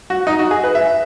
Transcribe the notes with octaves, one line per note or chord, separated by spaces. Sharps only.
F#4
D#4
F#4
G#4
B4
E5